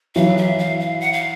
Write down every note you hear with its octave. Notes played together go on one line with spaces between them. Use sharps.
E3 F#3 F5
E5
F5
F5
F#5
F5